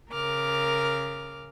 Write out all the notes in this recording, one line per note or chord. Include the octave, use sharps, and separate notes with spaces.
C#3 A#4 D6 F6